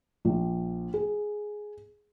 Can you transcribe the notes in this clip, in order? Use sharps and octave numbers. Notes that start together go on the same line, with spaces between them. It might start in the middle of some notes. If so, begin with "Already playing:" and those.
A#1
G#4